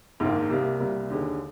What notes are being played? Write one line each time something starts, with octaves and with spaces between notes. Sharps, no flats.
A#1 G#2 D#3 A#3
C2 C3 G3 A#3
C2 C3 G3 A#3
D#2 D3 G#3